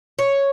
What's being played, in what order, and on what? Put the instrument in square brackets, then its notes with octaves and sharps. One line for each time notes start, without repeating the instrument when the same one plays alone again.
[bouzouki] C#5